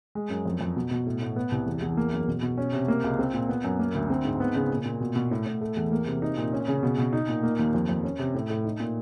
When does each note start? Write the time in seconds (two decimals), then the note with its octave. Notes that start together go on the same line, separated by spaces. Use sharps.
0.15 G#3
0.30 F#2
0.46 F2
0.61 F2
0.76 B2
0.91 B2
1.06 A2
1.22 A2
1.36 B3
1.52 C2
1.66 E2
1.82 E2
1.97 A#3
2.12 F#2
2.28 B2
2.42 B2
2.58 C#4
2.73 C3
2.88 A#3
3.04 C#2
3.19 C4
3.34 A#2
3.49 B3
3.64 F#2
3.79 A#3
3.95 D2
4.10 C4
4.25 G#2
4.40 B3
4.55 C#3
4.71 A#2
4.85 A#2
5.00 B2
5.16 B2
5.31 A2
5.46 A2
5.61 A3
5.77 E2
5.92 A#3
6.07 C3
6.22 D#4
6.37 A#2
6.52 C#4
6.68 C#3
6.83 B2
6.98 B2
7.13 D#4
7.29 A#2
7.43 A#3
7.59 D#2
7.74 F2
7.89 F2
8.04 C#4
8.19 C3
8.34 A2
8.50 A2
8.65 D#4
8.80 A#2